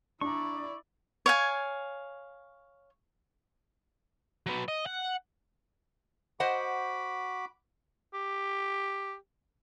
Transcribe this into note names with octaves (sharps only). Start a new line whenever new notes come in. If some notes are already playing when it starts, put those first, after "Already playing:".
D4 E4 D5 A#5 C#6
C#5 F5 G#5
F#3 B3
D#5
F#5
F#4 C5 D#5 F#5 B5 D6
G4